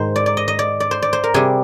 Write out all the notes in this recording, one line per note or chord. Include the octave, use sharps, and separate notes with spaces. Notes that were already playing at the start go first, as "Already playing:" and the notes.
Already playing: G#2 D#3 G#3 C5
D5
D5
D#5
D#5
D5
D5
C5
D5
C5
A#4
C3 G3 G#4